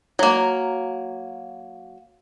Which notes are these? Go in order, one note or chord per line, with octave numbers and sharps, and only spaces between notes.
F#3 A#3